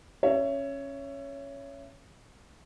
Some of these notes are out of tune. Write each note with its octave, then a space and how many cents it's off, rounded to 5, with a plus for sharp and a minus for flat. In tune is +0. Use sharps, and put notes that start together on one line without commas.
C#4 -10 C#5 +10 E5 +30